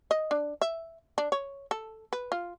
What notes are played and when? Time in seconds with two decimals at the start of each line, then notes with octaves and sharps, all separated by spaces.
0.11 D#5
0.31 D4
0.61 E5
1.18 D4
1.32 C#5
1.71 A4
2.13 B4
2.32 F4